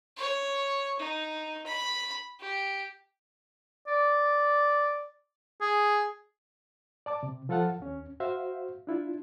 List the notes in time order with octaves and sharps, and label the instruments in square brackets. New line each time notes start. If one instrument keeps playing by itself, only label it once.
[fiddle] C#5
D#4
B5
G4
[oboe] D5
G#4
[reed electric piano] D5 A5 D6
C3
F3 F4 A4 F5 F#5 A5
D#2 C#4
F#4 C5 E5 F5
D4 E4 F4